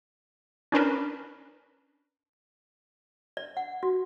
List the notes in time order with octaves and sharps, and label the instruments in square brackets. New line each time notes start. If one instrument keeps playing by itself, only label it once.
[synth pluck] C#4 D4 A#4 B4
[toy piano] D5
F#5
F#4